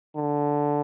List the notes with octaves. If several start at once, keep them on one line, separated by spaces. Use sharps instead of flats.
D3